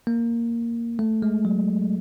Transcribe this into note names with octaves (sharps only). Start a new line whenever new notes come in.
A#3
A3
G#3
F#3